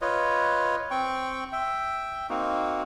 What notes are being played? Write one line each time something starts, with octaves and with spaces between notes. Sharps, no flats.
F4 B4 C#5 D#5
C4 G5 C#6
E5 G5
A#3 C4 D#4 F#4